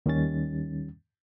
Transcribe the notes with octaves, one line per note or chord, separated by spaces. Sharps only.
D#2 D#3 G3 C#4 A6